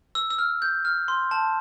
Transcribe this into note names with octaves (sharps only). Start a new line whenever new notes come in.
E6
E6
F6
G6
F6
C6
A5